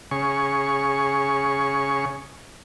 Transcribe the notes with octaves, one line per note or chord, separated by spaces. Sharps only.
C#3 G#4 C#6